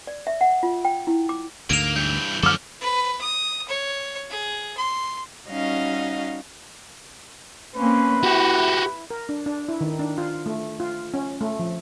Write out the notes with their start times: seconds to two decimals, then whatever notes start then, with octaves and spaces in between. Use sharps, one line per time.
0.07 D5
0.27 E5
0.41 F#5
0.63 F4
0.85 G5
1.07 E4
1.29 D6
1.70 D2 G#2 D3 A#3 D7 F7
1.96 G2 E3 G6
2.43 F#2 D3 F3 C#4 A4 D6 F6
2.81 B4
3.21 D#6
3.68 C#5
4.30 G#4
4.77 C6
5.49 G3 C#4 D#4 F#4 D#5 F5
7.76 A#3 C4 C#4 B4
8.24 E4 F#4 G4
9.11 A#4
9.29 D4
9.46 D4
9.69 E4
9.81 D#3
9.99 D4
10.18 F4
10.46 A3
10.80 F4
11.14 C#4
11.41 A3
11.59 F3